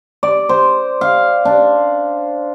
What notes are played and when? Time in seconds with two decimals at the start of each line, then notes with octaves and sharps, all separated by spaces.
0.23 D5
0.49 C5
1.01 F5
1.45 D4